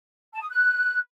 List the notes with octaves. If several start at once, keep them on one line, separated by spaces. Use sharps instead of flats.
A5
D#6
F#6